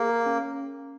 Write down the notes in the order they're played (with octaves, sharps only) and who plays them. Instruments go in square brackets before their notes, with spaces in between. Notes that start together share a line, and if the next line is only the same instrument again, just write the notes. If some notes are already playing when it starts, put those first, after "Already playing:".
Already playing: [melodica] A#3 [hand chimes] G#4
[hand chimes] A#4
C#4